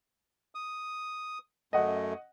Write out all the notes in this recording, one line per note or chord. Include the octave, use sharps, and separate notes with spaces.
D#6
F#2 A3 D#5 F#5